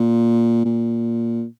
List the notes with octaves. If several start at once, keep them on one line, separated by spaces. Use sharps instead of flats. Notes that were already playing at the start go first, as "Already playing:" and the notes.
Already playing: A#2
A#2